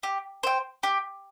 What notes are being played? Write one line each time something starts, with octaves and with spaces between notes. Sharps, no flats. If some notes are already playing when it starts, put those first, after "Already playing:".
G4
C5 G5
G4